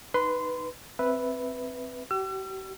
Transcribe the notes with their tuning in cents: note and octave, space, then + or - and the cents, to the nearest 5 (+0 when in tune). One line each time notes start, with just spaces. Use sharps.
D#4 +0 B4 +0 C6 -20
C4 +0 B4 +0 E5 +0
G4 -45 E6 +40